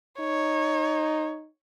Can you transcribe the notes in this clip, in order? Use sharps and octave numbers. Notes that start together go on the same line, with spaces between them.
D#4 C#5